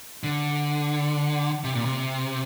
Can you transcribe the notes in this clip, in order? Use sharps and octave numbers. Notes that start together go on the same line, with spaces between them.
D3
C3
A#2
C3